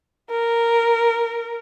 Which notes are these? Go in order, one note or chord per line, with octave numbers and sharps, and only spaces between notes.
A#4